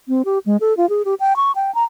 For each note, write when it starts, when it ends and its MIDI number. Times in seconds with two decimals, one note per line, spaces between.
0.08 0.22 60
0.25 0.39 67
0.46 0.57 56
0.61 0.76 69
0.77 0.89 65
0.89 1.02 68
1.05 1.14 67
1.20 1.36 79
1.36 1.52 85
1.55 1.73 79
1.75 1.84 82